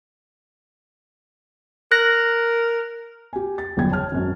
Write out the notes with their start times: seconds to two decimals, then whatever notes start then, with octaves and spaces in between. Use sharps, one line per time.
1.92 A#4 F#6 A#6
3.33 G4 G#5
3.58 A6
3.77 G1 E2 C#3 F#3 G5 G#6
3.91 C#5 A5 F6
4.12 G#1 F#2